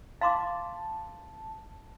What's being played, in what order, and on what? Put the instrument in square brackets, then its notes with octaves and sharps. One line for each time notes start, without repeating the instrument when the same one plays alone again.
[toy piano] F5 C6 D6 [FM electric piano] A5